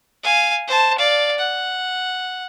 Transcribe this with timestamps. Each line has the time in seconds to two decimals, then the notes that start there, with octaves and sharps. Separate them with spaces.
0.24 F5 G#5
0.67 C5 A5
0.99 D5 F5
1.39 F#5